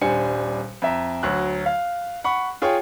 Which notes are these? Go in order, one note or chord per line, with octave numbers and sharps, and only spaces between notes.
D#1 G3 D4 C5 G#5 C#7
F2 E5 A#5
D2 F#3 F#6
F5
F#5 B5 C#6
F4 G#4 C#5 G5